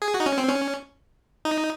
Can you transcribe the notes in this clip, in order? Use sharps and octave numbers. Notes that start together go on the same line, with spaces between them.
G#4
F#4
D#4
C#4
C4
C#4
D#4